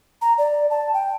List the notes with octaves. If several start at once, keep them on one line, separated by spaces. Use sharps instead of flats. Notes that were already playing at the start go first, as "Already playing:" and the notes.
A#5
D5
A5
G5